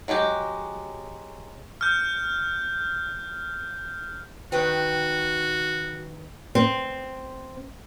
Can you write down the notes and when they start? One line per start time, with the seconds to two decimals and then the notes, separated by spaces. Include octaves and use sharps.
0.08 F#3 G#3 F#4 G4
1.81 F6 G6
4.52 D#3 F#4 B4 G5
6.55 C4